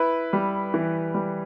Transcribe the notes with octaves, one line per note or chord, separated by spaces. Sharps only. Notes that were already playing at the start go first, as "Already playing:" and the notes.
Already playing: E4 B4
G3
E3
G3